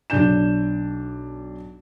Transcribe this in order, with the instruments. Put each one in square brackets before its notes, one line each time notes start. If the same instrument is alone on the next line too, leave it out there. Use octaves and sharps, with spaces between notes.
[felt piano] B1 D4 G6 E7